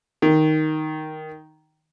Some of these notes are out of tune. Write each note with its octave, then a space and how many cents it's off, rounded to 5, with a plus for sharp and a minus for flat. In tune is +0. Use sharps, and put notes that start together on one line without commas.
D#3 +0